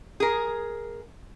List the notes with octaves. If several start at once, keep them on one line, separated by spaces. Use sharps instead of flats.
G#4 A#4